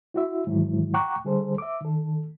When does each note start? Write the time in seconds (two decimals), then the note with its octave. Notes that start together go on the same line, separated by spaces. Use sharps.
0.14 E4 F#4 E5
0.47 G#2 D#3 E3 F#3 G#3 E4
0.94 F#5 G5 A#5 C#6 D6 F#6
1.25 D3 G3 G#4 A4 C5
1.58 E5 D6
1.81 D#3 A4